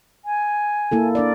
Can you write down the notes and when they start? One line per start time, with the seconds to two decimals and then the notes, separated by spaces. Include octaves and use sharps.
0.25 G#5
0.92 A#3 E4 A4
1.15 D4 A#4 D5